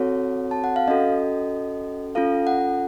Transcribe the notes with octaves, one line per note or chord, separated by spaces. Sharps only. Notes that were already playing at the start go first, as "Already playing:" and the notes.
Already playing: C4 F#4 A4 C#5
A5
F#5
F5
C#4 F#4 A4 D#5
C#4 F4 A4 F5
F#5